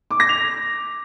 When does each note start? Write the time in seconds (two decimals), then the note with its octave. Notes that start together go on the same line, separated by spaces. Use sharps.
0.11 D6
0.20 A#6
0.29 F7